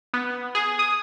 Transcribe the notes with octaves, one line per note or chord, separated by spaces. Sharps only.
B3
G#4
D#6